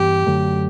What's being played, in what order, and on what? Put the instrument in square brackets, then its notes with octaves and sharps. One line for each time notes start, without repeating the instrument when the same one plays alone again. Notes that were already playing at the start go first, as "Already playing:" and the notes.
Already playing: [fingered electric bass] G2 E3 G3 B3 [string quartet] G4
[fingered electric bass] F#2 D3 F#3 A3